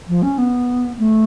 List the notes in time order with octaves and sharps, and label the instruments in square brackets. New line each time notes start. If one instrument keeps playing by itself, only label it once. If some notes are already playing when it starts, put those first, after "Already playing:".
[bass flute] F3
C#4
B3
A3